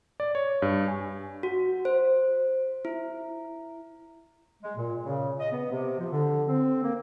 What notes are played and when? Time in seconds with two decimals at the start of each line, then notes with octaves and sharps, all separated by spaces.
0.20 D5
0.35 C#5
0.62 G2
0.88 G#5
1.43 F#4
1.85 C5
2.85 E4
4.63 G#3
4.77 A#2
5.05 C#3
5.40 D#5
5.52 B3
5.71 C3
5.99 F3
6.12 D3
6.48 C4
6.83 A#3